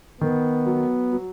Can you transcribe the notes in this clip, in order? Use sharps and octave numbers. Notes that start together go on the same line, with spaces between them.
D#3 B3
F#3
F#3